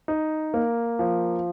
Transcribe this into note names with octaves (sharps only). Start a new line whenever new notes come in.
D#4
A#3
F3